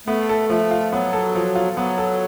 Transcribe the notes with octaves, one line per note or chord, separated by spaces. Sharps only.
A3 B3
A4
F3 A3
F4
F#3 B3
A4
F3
F4
F#3 B3
A4